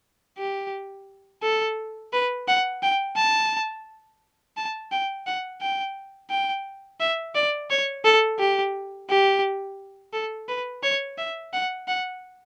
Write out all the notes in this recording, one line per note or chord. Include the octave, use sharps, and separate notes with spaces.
G4
A4
B4
F#5
G5
A5
A5
G5
F#5
G5
G5
E5
D5
C#5
A4
G4
G4
A4
B4
C#5
E5
F#5
F#5